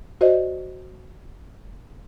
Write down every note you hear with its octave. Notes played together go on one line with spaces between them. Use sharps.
F#4 C5 D5 D#5